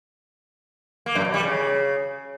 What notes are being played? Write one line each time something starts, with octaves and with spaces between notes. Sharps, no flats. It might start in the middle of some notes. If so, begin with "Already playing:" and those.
A#3
F#2
B2
G3
C#3